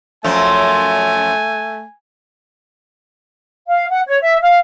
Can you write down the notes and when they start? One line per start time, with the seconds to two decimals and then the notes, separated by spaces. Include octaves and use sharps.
0.24 F#2 F3 A3 G#5
3.69 F5
3.88 F#5
4.06 C#5
4.21 E5
4.42 F5